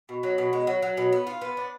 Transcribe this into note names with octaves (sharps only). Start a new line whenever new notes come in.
B2
F#3
B2
G#3
F#3
F#3
B2
B3
F4
B3
D4